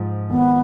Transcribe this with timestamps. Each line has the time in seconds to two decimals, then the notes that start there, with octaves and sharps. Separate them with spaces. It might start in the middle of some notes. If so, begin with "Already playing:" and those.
Already playing: G#2 F3
0.30 G#1 B3